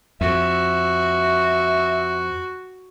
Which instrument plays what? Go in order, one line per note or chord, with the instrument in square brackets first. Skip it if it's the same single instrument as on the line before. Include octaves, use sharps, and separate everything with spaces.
[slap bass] F2 [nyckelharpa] F#4 [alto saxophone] E5